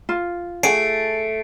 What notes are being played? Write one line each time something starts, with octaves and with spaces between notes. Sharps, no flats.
F4
A3 G#4 F#5 G#5 C7 D7